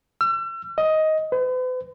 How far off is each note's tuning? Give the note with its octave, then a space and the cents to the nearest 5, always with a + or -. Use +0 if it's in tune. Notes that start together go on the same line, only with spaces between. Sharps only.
E6 +40
D#5 +10
B4 +45